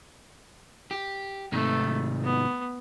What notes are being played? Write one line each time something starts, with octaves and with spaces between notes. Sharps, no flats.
G4
G#2 C3 D#3 A3
B3